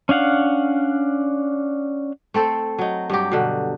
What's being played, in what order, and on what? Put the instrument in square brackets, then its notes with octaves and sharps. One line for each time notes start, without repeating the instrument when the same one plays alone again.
[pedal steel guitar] C#4 D4 F5 F#5
[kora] A3 C4 A4 C5
F#3 D#4
G2 F#3 G4
B2 D3